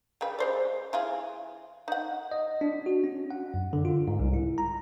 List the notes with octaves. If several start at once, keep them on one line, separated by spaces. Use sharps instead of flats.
C#3 G3 B4
G#3 C5 D5
E3 F4 G#4
D#4 F#5
D#5
D4
F#4
C#4
F#5
F#2
D3
F4
G#2
C2
E4
A#5